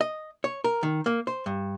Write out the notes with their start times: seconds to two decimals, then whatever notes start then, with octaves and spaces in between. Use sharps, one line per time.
0.01 D#5
0.44 C#5
0.64 A#4
0.83 D#3
1.06 A#3
1.27 C5
1.46 G2